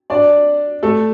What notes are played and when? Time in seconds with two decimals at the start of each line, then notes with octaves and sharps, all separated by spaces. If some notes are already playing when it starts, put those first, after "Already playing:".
0.10 D4 D5
0.83 A3 A4